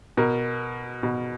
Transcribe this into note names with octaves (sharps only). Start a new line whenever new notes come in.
B2 A#4
B2